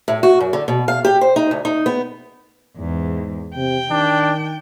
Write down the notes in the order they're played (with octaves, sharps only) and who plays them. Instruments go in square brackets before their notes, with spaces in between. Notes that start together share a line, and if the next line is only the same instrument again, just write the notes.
[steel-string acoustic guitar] A2
F#4
F#2
D3
B2
F5
G4
C5
D#4
D2
D#4
B3
[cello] E2 [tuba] G#2
[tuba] C3 [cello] G5
[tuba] D#3 [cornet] D4